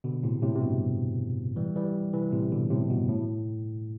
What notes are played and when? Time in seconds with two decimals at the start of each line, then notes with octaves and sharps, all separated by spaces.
0.04 B2 D3
0.23 A2 C3
0.42 A2 C3
0.55 C3
0.61 G2 B2
1.56 E3 G3
1.76 E3 G3
2.13 C3 E3
2.32 A2 C3
2.52 B2 D3
2.70 A2 C3
2.90 G2 B2
3.08 A2